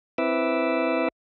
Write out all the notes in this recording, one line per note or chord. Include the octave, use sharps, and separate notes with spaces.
C4 E4 B4 E5 D6 E6